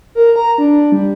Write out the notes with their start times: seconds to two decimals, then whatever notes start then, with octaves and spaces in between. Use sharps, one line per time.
0.15 A#4
0.36 A#5
0.58 D4
0.92 G3